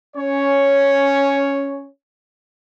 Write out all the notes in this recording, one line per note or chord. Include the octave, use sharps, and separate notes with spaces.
C#4 C#5